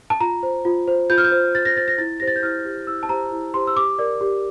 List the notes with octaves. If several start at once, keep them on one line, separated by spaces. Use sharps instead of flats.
A5
F4 A#5
C5
F4
C5
F4 G6
F6
G6
C5
F4 A6
A#6
C5 A6
A#6
E4 A6
G4 C5 A#6
A6
G6
E4 F6
G4 C5
E4 E6
A5
G4 C5 A#5
E4
G4 C5 C6
E6
G4 D6
A#4 D5
G4